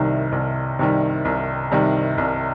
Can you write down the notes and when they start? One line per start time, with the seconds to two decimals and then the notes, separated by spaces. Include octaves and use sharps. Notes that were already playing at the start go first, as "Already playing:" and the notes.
Already playing: C2 C3 D#3 G3
0.32 C2
0.79 C3 D#3 G3
1.25 C2
1.72 C3 D#3 G3
2.18 C2